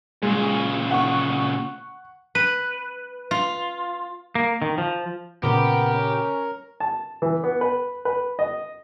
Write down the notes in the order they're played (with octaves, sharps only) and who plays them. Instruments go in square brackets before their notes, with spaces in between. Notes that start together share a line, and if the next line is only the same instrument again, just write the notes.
[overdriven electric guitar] A#2 C#3 [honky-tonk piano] G#3
[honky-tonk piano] F#5 C#6
[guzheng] B4
F4
[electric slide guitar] A#3
D#3
F3
[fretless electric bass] A#2 C#3 [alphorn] B3 [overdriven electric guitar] G4 [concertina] A#4
[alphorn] C#4
[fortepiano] A5
E3
B3
B4
B4
D#5